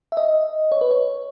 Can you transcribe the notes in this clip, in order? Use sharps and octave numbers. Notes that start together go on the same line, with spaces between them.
E5
D#5
C#5
B4
C#5